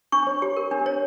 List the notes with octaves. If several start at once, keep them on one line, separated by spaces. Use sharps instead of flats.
D4 C#6
C#5
G4
A#4
D4
C#5